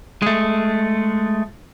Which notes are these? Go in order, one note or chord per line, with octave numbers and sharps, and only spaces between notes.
G#3 A3